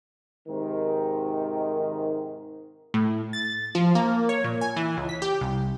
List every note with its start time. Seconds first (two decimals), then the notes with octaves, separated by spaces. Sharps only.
0.48 G#2 C3 D#3
2.94 A2
3.33 A6
3.75 F3
3.95 A#3
4.29 C#5
4.44 A#2
4.61 G#5
4.76 E3
4.97 C#2
5.09 B6
5.22 G4
5.41 C2